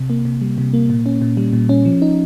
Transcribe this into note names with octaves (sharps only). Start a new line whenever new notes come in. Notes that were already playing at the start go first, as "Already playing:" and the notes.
Already playing: C3
A#3
C3
G3
C3
A#3
A#2
C#4
A#2
G3
A#2
C#4
F3
D#4